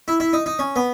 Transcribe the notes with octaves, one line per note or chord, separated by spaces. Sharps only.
E4
E4
D#4
D#4
C#4
B3